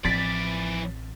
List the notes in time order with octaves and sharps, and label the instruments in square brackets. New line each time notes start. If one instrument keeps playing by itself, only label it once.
[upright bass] A1 C4 [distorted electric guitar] E3 D5 [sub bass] F3 [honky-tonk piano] A6 B6